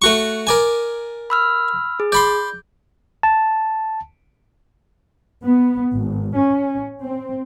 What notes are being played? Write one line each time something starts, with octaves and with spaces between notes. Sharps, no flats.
A3 F#4 C#6
A#4 D5 G#5
B5 E6 F6
G#4
D5 B5 C6 G6
A5
B3
G#1
C#4
C4